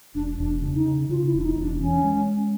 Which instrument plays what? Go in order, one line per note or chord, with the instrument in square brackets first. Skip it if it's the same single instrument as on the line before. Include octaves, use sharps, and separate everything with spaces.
[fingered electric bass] E1 [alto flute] D4
[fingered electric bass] E1 [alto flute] D4
[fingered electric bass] C#3
[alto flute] D#4
[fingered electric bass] C#3
[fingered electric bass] C#3 [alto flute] F4
[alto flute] E4
[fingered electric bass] E1 [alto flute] D4
[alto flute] D#4
[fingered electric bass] E1
[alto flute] D4
[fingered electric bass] E3 [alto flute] C#4
[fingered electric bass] G#3